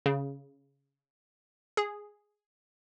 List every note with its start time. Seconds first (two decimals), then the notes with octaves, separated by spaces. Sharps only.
0.06 C#3
1.77 G#4